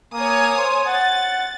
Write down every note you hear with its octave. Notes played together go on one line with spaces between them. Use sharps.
A#3 C#5 G#5 D#6
C5
F#5 A6